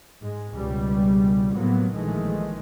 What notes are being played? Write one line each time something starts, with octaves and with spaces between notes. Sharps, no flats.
G#2 G#3
C#2 B2 G3
A2 C3 F#3 A#3 B3
A#1 D#3 E3 G#3 A3